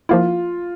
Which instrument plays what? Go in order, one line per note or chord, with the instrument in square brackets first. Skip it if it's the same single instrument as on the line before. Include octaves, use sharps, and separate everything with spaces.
[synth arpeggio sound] F3 A#3 E4 [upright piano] F4